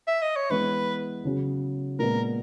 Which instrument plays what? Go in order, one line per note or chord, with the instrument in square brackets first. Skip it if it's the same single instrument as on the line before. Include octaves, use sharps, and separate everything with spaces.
[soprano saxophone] E5
D#5
C#5
[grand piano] E3 G#3 B3 [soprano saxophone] B4
[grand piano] C#3 F#3 C#4 G#4
[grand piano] A#2 G#3 B3 [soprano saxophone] A#4